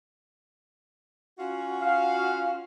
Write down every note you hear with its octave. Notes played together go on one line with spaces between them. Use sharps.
C#4 F4 F#4
F5